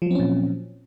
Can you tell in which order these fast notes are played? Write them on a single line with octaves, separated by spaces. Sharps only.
F3 F#3 C4 C#4 A#2